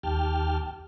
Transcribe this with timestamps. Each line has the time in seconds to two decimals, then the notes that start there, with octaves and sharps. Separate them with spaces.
0.03 D#2 G4 G5 A5 F6